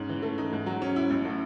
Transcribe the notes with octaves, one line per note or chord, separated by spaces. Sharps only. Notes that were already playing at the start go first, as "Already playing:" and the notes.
Already playing: G#2 C#4
E3
A3
D#4
G#2
F#3
C#4
E4
A1
A2